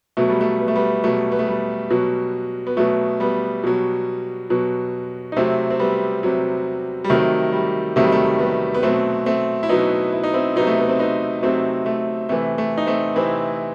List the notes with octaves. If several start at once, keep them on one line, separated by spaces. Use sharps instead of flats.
B2 F#3 A3
G3
A3
B3
A3
G3 B3
B2 F#3 A3
B3
A3
G3
B2 F#3
B3
B2 F#3 A3
G3 B3
B2 F#3
B2 F#3
D#4
C3 F#3 A3 C4
C4
G3 B3
C3 F#3
G3
C3 D#3 F#3 A3
G3
C3 D#3 F#3 A3
G3
A3
G3 B3
B3
B2 F#3 A3 C4
A3 C4
E4
B2 F#3 B3 D#4
E4
D#4
C4 E4
C3 F#3 B3 D#4
A3
B3
C4
B3 D#4
C3 F#3 A3 C4
A3
C3 E3 A3
A3
D#4
A3 C4
C3 E3 C4 E4